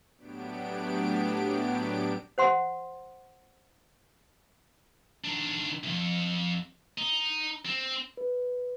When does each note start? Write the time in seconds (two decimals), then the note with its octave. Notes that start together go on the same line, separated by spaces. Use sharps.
0.17 A2 F#3 B3 D4 G4 D7
2.38 C5 F#5 C6
5.24 D#3 D4
5.83 C2 F2
6.98 D#4
7.65 C4
8.17 B4